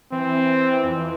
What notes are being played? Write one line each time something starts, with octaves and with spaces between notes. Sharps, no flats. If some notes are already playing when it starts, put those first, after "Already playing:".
E3 C4
E3
E3
F2